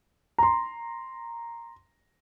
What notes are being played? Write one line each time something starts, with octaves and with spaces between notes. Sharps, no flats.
A#5 C6